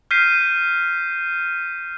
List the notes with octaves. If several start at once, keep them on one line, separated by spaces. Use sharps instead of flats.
F6 G6 B6 C7 D#7